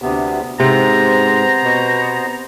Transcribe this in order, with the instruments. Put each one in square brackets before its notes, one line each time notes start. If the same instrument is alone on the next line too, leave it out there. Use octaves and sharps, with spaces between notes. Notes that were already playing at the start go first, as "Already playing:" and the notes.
[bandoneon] D2 C3 B3
[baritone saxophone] G#2 [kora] C3 [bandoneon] B3 C5 [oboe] A#5
[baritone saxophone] B2